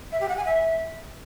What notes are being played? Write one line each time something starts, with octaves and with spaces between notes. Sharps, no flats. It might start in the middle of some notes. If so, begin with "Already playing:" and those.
E5
G4
F#5
G#5
E5